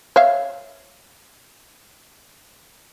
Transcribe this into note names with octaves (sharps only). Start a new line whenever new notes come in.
C#5 E5 F5